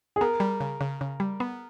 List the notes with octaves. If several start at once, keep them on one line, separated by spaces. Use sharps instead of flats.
G#4
B3 A#4
G3
C#3
C#3
C#3
G3
B3